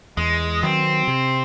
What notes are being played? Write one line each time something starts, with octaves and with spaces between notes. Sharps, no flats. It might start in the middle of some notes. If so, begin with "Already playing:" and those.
E2 G#3
D#3 F#3 C4
C3